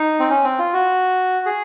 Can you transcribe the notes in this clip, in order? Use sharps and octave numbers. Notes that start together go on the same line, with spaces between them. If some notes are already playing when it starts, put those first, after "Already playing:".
Already playing: D#4
C4
C#4
C4
F4
F#4
G#4